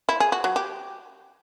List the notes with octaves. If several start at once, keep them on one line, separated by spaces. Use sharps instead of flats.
E4
G#4
F#4
F#3
G4